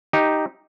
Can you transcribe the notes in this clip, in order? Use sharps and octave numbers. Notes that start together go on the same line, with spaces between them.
D#4 G4